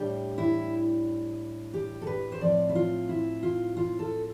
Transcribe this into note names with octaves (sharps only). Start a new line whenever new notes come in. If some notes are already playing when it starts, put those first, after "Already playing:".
Already playing: A2 G3 D4 G4
E4
G4
A4
B4
C5
A2 F3 C4 D5
E4
F4
E4
F4
F4
A4